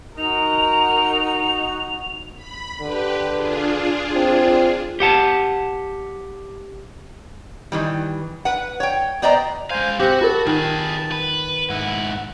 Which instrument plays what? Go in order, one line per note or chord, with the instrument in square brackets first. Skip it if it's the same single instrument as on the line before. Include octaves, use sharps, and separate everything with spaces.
[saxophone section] D#4 [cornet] F#4 [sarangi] A#4 [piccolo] F7
[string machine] B5
[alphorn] D3 [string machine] G4 B4
[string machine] D4 F4 G#4
[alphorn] C4
[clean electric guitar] G4 F#5 A5
[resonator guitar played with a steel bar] D#3 E3 G3
B4 F#5
C#5 G5
B3 C5 D5 D#5 G5 A#5
[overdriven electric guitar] G#3 F5 [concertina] C5 G#5
[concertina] C4 [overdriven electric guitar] F#4 [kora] G4 F#5
[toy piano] F4 A#4 [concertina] A5
[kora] D#3 [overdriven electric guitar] G#4 B4
[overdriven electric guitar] B4
[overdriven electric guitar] G#2 E4 [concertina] F#5